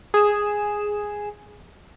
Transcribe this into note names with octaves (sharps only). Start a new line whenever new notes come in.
G#4 E7